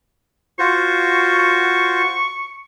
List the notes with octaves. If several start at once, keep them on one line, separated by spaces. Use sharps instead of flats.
F4 F#4 C5 C#6
C#6